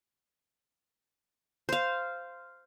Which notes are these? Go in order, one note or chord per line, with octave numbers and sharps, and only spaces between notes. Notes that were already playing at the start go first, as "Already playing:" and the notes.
C5 F5